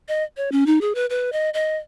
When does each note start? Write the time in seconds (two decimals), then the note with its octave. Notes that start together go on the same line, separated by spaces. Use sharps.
0.08 D#5
0.37 C#5
0.52 C#4
0.66 D#4
0.81 G#4
0.95 B4
1.10 B4
1.32 D#5
1.54 D#5